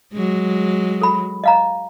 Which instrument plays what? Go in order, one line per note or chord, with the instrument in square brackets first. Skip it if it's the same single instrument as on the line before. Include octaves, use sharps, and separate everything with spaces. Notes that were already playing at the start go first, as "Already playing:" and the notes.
[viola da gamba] F#3 G#3
[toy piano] A4 B5
D#5 F5 A#5